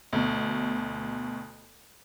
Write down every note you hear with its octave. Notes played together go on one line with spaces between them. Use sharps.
D2 B2